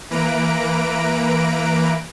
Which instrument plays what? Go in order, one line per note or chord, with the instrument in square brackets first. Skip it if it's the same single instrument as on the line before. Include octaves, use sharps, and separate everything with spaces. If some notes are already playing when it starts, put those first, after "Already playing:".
[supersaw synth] E3 A#3 B4 A#5 D7